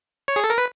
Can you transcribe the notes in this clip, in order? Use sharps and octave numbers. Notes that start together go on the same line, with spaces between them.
C#5
G#4
A4
A#4
B4